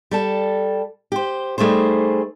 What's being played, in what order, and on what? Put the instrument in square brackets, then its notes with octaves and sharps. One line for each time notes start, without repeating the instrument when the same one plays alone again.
[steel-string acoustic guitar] G3 A4 A5
G4 C5
G3 A3 D#4 G#4 C5